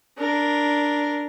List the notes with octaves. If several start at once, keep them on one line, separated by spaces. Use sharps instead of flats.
D4 A#4